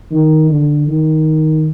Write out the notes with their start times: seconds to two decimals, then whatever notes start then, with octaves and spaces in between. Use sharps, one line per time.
0.11 D#3
0.50 D3
0.88 D#3